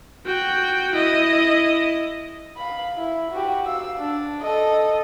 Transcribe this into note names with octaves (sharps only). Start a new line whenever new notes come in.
F#4 G5
E4 D#5
F5 B5
E4
F#4 G4
F5 E6
D4
A4 D#5